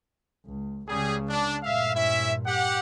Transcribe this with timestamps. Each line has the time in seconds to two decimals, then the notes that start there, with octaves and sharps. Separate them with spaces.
0.46 C#2
0.88 C#2 C#3 G3 G#4
1.29 D4
1.63 G2 A#2 E5 F5
1.95 C#4 E4 E5
2.46 G4 F#5